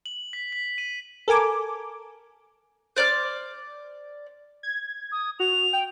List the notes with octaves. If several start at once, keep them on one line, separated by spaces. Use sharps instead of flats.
F#7
B6
B6
D#7
A4 A#4 G#5 D6
C5 D5 D6 F6
G#6
D#6
F#4 F7
G5